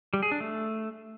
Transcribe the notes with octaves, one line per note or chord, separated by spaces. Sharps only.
G3
G#4
D4
A3